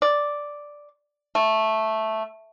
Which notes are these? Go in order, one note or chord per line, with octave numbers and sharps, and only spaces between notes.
D5
A3